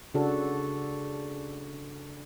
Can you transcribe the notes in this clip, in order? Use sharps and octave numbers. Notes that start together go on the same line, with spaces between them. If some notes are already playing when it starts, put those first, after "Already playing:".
C#3 D4 F#4 A4